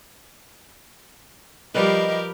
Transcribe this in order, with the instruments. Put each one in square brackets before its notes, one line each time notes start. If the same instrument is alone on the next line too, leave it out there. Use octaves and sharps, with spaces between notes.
[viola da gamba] F3 G4 A#4 [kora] G3 B4 [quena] D#5